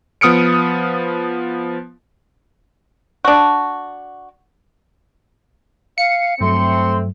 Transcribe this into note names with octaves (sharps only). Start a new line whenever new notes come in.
F3 B3 D#6 F6 C#7 D7
D4 F#4
F5 C#7
G2 F#3 A3 C4 C6